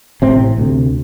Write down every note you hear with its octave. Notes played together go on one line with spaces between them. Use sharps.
A1 A2 C3 C4
D2 C3